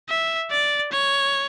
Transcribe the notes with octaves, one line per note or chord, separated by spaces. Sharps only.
E5
D5
C#5